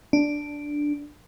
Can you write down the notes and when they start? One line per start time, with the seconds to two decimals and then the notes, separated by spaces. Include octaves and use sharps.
0.13 D4